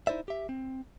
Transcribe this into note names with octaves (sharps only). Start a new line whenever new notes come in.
D#4 E4 C5 D5 E5
G4 E5
C4